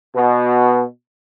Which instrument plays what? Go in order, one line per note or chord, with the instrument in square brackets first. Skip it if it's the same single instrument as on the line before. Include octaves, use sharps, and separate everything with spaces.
[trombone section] B2